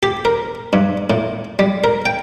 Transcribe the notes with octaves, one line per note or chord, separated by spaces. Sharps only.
G4
A#4
G2
A2
G3
A#4
G5